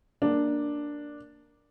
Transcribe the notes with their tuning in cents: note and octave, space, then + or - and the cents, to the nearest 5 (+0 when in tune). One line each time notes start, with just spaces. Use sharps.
A#3 +0 D4 +0